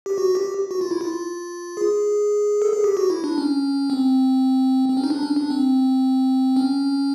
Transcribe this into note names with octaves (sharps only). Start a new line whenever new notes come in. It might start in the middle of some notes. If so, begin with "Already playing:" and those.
G4
F#4
G4
F#4
F4
E4
F4
G#4
A4
G#4
G4
F#4
E4
D4
C#4
C4
C4
C#4
D#4
D4
C#4
D4
C4
C#4